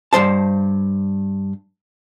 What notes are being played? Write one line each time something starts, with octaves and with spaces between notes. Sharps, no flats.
G2 E3 C5 A5